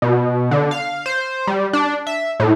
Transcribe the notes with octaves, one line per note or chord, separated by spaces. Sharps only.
B2
D3
F5
C5
G3
D4
E5
A2